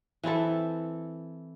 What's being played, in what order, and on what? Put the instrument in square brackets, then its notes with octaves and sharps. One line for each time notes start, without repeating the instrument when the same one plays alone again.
[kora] E3 C4 E4 A4